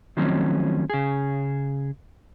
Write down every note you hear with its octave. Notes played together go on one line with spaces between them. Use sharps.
D#3 F3 F#3 A3 C4 C#4
C#3 G#4